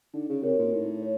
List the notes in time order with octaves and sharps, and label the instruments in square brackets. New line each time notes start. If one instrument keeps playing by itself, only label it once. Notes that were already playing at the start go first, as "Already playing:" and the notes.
[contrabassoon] D3 [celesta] D#4
[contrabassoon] C#3
[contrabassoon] C3 [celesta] F#4 A#4 C#5
[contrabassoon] A#2
[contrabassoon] A2 [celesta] D#4
[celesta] C#5